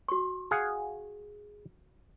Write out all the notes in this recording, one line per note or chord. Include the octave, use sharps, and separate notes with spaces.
F#4 C#6
G#4 F5 F#5